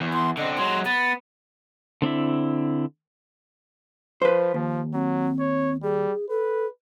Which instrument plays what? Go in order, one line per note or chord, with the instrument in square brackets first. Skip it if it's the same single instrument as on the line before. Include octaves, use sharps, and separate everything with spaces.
[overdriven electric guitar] E2
[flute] C6
[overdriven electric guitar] D3 C4 [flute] D#5
[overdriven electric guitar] F#3 G#3 [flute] C6
[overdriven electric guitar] B3 [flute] A6
[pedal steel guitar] D3 C4 D4 E4
[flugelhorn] F3 [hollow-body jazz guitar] B4 C5
[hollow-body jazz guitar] D#2 [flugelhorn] F3
[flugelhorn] F#3 [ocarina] C4
[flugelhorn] C#5
[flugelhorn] G3 [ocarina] G#4
[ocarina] A4 [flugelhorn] B4